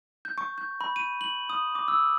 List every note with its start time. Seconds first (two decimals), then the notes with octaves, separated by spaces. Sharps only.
0.25 G6
0.38 C#6
0.58 G6
0.81 B5
0.96 D#7
1.21 F#7
1.50 D#6
1.75 D6
1.88 E6